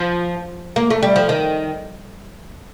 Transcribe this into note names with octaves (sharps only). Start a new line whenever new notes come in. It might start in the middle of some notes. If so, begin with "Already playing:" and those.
Already playing: F3
A#3
A3
G3
F3
D#3